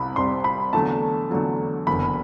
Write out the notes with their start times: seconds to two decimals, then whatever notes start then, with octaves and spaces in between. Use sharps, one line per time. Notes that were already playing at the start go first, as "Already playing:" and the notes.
Already playing: C2 C3 G3 B5
0.16 C2 C3 G3 C6
0.44 B5
0.73 E2 D3 F#3 A3 A5
1.30 E2 D3 F#3 A3
1.87 F#1 E2 D3 B5